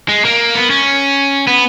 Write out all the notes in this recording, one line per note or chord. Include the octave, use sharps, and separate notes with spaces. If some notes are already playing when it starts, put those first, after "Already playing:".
G#3
A#3
B3
C#4
B3